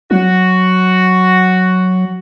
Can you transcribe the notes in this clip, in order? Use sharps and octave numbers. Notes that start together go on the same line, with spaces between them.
F#3 F#4